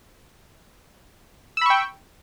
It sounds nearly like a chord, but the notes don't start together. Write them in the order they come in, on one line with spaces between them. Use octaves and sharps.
E6 B5 C#6 G5